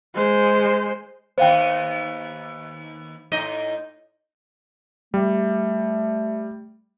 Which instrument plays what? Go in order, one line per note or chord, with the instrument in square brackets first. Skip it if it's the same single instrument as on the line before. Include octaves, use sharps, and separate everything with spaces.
[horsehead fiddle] G#3 C5
[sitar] D#2 B3 [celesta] C5 F5 G5
[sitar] A2 D#4 D#5
[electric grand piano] G3 [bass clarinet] A3